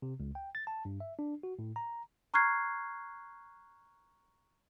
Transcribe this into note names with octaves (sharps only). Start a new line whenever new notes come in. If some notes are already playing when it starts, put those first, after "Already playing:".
C3
C#2
G5
A6
A5
G2
E5
D4
F#4
A2
A#5
A#5 C#6 F6 F#6 G#6 C7